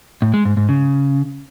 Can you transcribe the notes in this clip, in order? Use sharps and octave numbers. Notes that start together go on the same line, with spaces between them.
A2
G#3
G#2
G#2
C#3